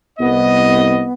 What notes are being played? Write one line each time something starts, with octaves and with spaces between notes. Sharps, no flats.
C2 B3 D#5